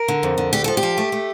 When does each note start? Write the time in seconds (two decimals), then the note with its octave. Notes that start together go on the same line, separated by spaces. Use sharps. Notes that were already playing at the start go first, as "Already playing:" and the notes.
Already playing: A#4
0.08 D3
0.23 F2
0.38 D3
0.53 D2 G4
0.64 F3 A4
0.77 G4
0.83 F3
0.98 A3
1.12 A3